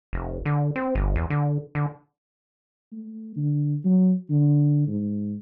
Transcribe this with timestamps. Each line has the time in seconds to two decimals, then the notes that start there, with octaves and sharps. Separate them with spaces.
0.13 F1
0.45 D3
0.76 C4
0.95 G1
1.16 E2
1.30 D3
1.75 D3
2.92 A3
3.36 D3
3.85 F#3
4.30 D3
4.87 G#2